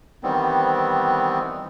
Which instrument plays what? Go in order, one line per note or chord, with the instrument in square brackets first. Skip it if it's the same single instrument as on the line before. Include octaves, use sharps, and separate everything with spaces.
[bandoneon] D#3 E3 G3 B3 C4